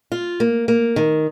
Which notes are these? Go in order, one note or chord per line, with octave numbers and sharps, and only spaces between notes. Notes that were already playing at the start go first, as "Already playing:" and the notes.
F4
A#3
A#3
D#3